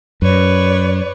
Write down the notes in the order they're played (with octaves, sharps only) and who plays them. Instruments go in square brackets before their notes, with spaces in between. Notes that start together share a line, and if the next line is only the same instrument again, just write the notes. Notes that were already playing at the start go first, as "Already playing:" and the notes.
[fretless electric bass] F#2 [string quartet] B4 C#5 D5